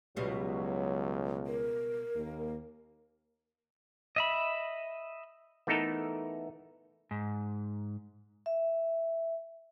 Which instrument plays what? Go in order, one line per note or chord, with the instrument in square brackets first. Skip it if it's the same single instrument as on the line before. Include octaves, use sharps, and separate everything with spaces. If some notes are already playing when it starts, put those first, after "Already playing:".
[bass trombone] C#2 [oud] B2 G3 F4 [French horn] F#3
[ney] A#4
[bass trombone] D#2 [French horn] A#3
[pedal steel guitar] D#5 E5 B5
[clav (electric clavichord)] E3 A3 B3 D#4 A4 A#4
[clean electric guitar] G#2
[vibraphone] E5